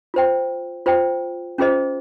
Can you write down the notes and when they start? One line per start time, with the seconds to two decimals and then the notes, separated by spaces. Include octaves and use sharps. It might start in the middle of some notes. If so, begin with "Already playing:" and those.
0.14 F4 C5 G5
0.86 F4 C5 G5
1.58 C#4 F4 G#4 C5 D#5